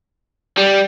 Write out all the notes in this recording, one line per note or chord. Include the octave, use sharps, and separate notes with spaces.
G3